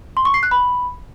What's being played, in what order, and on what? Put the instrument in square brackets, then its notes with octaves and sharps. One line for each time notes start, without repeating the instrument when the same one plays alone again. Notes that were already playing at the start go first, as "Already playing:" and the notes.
[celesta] C6
C#6
C7
F#6
B5